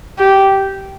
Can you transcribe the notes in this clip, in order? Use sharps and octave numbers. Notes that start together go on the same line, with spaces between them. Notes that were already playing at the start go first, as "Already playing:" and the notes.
G4